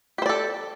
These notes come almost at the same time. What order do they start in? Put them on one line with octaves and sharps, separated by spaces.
G4 C5 D5 A4